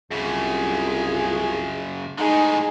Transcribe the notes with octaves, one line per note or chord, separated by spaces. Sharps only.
C2 F#2 C#3 F4 G#4
A2 G#3 D#4 G#4